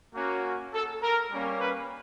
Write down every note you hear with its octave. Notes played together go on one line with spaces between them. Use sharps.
A#3 C#4 F#4
A4
A#4
G3 A#3 C#4
B4